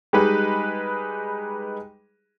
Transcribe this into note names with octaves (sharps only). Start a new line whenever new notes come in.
G3 G#3 D#4 G4 G#4 B4